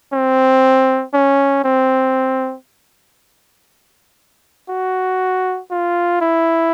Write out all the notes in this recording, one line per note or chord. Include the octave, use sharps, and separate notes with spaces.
C4
C#4
C4
F#4
F4
E4